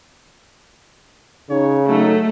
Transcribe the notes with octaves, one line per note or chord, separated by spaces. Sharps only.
C#3 D#4 C#5
F#3 A3 D#4